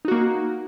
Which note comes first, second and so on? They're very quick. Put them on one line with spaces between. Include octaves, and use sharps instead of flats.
D#4 F#4 A#3